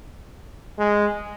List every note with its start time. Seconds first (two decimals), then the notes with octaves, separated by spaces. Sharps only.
0.79 G#3